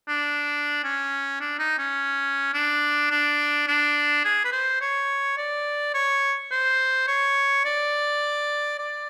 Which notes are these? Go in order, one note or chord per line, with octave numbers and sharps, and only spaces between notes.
D4
C#4
D4
D#4
C#4
D4
D4
D4
G#4
B4
C5
C#5
D5
C#5
C5
C#5
D5
D5